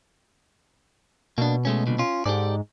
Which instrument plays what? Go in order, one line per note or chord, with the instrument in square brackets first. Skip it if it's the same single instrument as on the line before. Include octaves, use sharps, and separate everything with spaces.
[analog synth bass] B2 [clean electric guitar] A#3 D4
[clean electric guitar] G#3 A3 C#4
C2 A#2 D3
C#4 F4
[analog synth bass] G#2 [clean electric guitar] G4 A4 D5